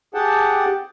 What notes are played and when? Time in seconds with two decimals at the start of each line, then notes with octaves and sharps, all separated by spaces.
0.14 G4 G#4 F#5 G5 A5